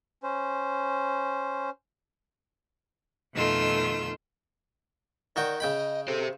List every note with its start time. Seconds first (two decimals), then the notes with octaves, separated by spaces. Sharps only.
0.23 C#4 C5
3.34 F2 B2 D#3 A3 F4 E6
5.36 D#3 F#4 D5 G5
5.60 C#3 D#5 G5 B5
6.08 G4 A4 C5